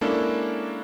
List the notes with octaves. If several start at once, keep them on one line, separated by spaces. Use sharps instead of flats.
G#3 A#3 C#4 D4 E4 A4